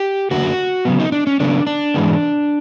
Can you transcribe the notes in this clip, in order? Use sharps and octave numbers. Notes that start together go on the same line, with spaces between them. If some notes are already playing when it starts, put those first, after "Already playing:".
Already playing: G4
F#2 D3 F#3 A#3 F#4
C#3 F#3 B3
D#4
D4
C#4
C#3 F#3 B3 D4
D4
G#2 E3 G#3 B3